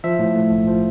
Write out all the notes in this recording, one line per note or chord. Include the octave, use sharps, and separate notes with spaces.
F3 E5
A2
A3
B1
F3